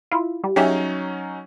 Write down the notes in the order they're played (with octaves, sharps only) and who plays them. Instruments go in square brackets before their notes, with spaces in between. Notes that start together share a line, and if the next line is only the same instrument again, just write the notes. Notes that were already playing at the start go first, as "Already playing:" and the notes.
[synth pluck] E4 F4
G3
[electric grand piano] F#3 C#4 D#4 [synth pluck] G4 G#4 E5